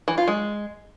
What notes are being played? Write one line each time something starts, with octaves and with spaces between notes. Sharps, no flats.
E3
F4
G#3